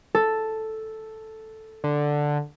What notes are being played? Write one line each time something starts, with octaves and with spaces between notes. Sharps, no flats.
A4
D3